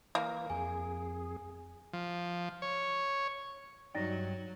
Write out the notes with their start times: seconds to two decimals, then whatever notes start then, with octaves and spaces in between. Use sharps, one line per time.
0.15 E3 A#3
0.50 F2 G#4 G#5
1.93 F3
2.62 C#5
3.95 G2 F#3 D#4 D5 G5 A6 A#6